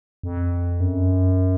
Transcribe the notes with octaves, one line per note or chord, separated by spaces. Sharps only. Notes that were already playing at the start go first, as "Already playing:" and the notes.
F2
F#2